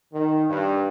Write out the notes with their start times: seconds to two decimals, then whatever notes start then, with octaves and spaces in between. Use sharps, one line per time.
0.13 D#3
0.50 G2